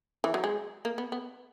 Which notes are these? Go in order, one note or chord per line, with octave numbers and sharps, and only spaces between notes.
E3
F#3
G#3
A#3
B3
B3